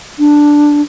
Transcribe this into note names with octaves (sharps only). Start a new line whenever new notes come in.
D4